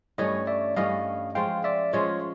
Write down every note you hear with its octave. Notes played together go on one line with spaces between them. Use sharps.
G2 E3 A3 C#4 C#5 D#5
D5 E5
G2 E3 A3 C#4 D#5 F5
F3 G#3 C#4 F4 F5 G5
D5 E5
F3 G#3 C#4 F4 C#5 D#5